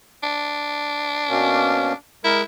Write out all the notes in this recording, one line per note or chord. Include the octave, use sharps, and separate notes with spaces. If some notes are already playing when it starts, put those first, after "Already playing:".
D4
B2 A#3 C#4
G#3 E4 A#4